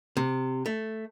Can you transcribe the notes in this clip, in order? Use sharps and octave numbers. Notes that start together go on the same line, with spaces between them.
C3
A3